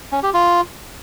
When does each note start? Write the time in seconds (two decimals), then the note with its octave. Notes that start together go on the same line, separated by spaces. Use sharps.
0.12 C#4
0.23 G4
0.34 F4